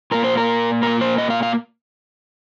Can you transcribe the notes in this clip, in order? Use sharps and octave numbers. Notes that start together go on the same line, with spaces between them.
A#2 A#3 A#4
C5
A#4
A#2 A#3 A#4
C5
D#5
F5
F5